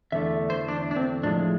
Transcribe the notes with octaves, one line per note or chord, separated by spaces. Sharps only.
E2 D3 A3 E5
C5
D4
D4
C4
A2 F3 G#3 D4